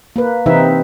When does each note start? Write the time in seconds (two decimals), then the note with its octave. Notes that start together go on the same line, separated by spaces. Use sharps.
0.16 A#3 B4
0.46 C3 E3 C4 D#4 B4 E5